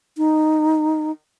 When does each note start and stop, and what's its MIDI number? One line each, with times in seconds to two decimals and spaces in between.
0.18 1.11 63